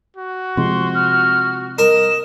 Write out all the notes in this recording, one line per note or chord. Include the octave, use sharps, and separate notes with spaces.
F#4
C3 F3 G#3 C6
F6
A#4 D#5 E7